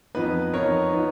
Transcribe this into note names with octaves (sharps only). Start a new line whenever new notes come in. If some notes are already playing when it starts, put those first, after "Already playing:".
F2 F3 B3 D#4 B4
F2 F3 B3 D#4 A#4 C#5
F3 B3 D#4